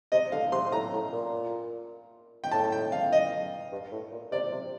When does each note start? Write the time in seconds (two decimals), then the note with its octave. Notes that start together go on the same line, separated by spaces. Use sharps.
0.12 C3 D#5
0.32 D3 F5
0.52 C3 C6
0.72 A2 A#5
0.92 A2
1.12 A#2
2.44 G5
2.51 A2 A5
2.72 G5
2.92 F5
3.12 D#5
3.72 G2
3.91 A2
4.12 A#2
4.32 C3 D5
4.51 C3